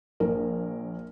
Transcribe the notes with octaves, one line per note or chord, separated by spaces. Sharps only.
A#1 A#4